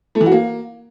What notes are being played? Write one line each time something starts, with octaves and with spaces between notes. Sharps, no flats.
A3
E3
F#4
A#3